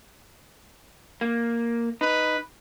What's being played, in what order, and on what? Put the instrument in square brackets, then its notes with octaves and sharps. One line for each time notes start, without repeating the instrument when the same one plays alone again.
[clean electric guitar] A#3
[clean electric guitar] D#4 [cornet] B4